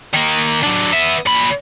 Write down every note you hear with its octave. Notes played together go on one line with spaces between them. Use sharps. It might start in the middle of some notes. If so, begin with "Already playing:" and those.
D#3 A#3
F#3 D4
B3 E5
A#2 B5